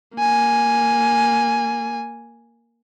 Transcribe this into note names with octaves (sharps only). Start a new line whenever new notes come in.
A#3 G#5